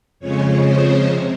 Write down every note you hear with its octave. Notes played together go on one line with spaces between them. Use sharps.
F2 C#3 F3 G#3 C#5
C5
C3